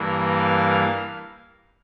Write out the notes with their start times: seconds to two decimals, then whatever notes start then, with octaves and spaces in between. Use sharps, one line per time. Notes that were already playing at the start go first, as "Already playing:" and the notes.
Already playing: G2 E3 A#3
0.30 F5